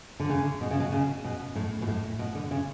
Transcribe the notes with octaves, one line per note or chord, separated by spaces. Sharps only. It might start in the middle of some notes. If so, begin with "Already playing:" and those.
D3
C#3
B2
C#3
B2
C#3
B2
A2
B2
A2
B2
D3
C#3